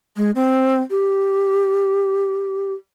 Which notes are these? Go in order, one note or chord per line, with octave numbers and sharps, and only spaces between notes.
G#3
C4
G4